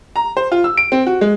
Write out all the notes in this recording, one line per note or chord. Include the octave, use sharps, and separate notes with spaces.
A#5
C5
F4
E6
D7
C4
F#4
G#3